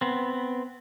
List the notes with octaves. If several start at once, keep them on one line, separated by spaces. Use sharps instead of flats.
B3 C4